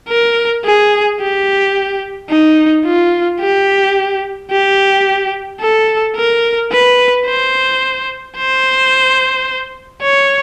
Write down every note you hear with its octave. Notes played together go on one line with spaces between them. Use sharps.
A#4
G#4
G4
D#4
F4
G4
G4
A4
A#4
B4
C5
C5
C#5